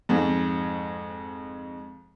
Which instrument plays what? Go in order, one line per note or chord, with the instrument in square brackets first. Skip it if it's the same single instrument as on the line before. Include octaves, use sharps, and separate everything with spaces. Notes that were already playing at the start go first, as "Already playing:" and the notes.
[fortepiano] F2 G#2